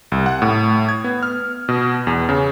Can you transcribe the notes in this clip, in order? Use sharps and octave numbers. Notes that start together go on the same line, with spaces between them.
C2
F#5
A2
G#6
B3
F6
B2
E2
C#3